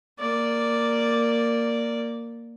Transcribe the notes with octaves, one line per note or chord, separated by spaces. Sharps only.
A#3 D5